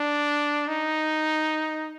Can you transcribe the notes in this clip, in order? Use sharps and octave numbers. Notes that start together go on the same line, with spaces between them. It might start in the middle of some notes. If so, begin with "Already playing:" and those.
Already playing: D4
D#4